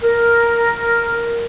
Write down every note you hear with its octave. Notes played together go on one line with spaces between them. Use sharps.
A#4